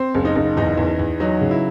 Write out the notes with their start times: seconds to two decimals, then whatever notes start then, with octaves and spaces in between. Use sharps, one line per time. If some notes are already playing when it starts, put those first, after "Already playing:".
Already playing: C4
0.14 F#1
0.25 D#4
0.35 F#1
0.57 E2 D#4
0.77 E2
0.99 E2
1.20 F#3 D#4
1.41 C#3
1.51 E4